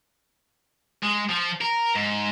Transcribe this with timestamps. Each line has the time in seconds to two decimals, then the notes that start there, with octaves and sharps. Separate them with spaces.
1.03 G#3
1.29 F3
1.61 A#4
1.96 G#2